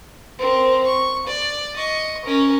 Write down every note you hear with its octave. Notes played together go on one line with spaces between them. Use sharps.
C4 A#4
C#6
D5
D#5 C#6
C#4 A#4